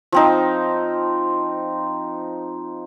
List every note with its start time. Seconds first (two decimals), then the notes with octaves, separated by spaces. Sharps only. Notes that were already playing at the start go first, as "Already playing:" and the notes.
0.12 F3 C4 D#4